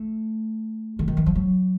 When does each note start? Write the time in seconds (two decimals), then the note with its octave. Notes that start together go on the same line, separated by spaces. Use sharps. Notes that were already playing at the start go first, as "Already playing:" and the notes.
Already playing: A3
0.99 D3
1.08 D#3
1.17 E3
1.26 F3
1.35 F#3